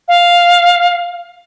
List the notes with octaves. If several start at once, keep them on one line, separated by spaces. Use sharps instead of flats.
F5